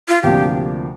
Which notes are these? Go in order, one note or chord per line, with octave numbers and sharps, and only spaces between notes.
F4
D2 C3 F3 A#3 D4 G4